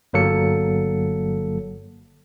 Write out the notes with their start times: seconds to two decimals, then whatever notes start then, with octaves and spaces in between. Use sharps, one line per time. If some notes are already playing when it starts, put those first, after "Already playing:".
0.13 G1 F#3 A#3 A4 C#7